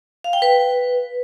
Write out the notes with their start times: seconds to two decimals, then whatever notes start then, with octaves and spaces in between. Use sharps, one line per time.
0.24 F5
0.33 G5
0.42 B4